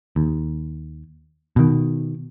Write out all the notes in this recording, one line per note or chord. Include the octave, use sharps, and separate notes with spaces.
D#2
B2 D#3